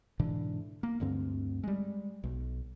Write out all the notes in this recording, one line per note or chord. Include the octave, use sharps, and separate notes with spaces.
G#2 B2 D3 E3
A#3
D2 G2 D3 C4
G3 G#3
B1